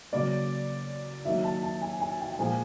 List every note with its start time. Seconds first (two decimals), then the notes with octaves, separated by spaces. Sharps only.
0.12 C#3 F#3 A#3 D5
1.25 D#3 F#3 A#3 E5
1.44 A5
1.63 A5
1.82 G#5
2.00 G#5
2.20 G5
2.32 G5
2.39 A#2 F3 G#3 G#5